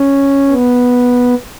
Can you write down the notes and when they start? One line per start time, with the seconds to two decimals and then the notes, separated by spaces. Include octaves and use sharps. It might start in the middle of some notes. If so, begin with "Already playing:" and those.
Already playing: C#4
0.49 B3